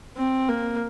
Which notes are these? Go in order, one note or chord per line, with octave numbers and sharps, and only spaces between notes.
C4
A#3